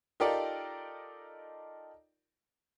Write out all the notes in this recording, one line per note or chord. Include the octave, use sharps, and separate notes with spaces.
D#4 F4 G4 A4 A#4 D5